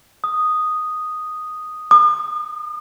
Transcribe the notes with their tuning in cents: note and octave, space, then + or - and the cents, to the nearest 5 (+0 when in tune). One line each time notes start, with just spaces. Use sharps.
D#6 -5
D#6 -45